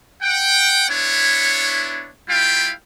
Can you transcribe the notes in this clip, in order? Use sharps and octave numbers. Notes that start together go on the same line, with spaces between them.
F#5 G5
B3 D4 E4 C#5
G3 E4 F4 F5 G5